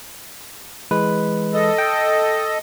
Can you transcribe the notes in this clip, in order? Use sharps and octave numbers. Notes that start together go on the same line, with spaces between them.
E3 G#3 B4
A4 D#5
G5